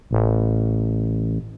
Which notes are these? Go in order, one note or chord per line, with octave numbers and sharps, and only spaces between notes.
A1